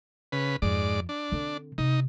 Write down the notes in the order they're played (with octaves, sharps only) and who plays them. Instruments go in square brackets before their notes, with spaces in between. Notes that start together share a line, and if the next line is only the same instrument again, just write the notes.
[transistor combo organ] C#3 B4
[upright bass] F2 F3 [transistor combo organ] G#2 D5
[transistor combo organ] D4
[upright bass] D3 C4
[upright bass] C3 [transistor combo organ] D#4